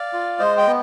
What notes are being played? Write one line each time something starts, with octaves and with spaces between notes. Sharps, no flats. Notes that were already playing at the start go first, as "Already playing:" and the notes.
Already playing: D5 F5
F4
G#3 C5 D#5
D#5 G5
B3